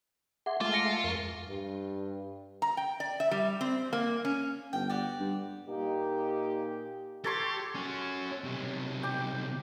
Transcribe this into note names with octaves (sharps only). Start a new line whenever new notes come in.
G#4 E5 F#5 C6 D6
G#3 A3 F4 E5 D6
A#6 C#7 D7
F2 A#4 C#6
G2
A#5
G5
D5
E5
G3
C4
A#3
C#4
G1 G5
F#4 G4 D5
G2
A#2 A#3 D#4 G4
G4 A4 C#5 C6
C#4 F#4
B1 C3
G5 D6